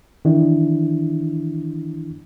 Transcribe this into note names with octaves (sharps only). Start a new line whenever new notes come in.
D#3 E3 D4 E4